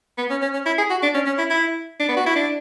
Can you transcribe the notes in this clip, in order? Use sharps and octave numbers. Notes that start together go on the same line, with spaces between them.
B3
C#4
C#4
C#4
E4
G#4
F#4
D4
C#4
C#4
E4
E4
D4
B3
F#4
E4
D4